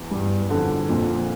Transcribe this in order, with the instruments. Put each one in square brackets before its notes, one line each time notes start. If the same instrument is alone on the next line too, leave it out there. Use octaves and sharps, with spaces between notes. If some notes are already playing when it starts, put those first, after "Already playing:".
Already playing: [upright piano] E2
[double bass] G2 [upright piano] G3
[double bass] F2 [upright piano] D3
[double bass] F2 [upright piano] A#2